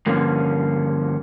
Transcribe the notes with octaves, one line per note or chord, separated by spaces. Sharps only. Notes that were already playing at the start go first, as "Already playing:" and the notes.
G2 D3 F3 A#3 C#4